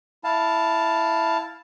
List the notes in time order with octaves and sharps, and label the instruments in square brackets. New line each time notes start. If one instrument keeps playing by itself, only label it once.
[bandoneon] E4 F5 A5